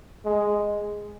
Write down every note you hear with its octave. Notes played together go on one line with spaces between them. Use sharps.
G#3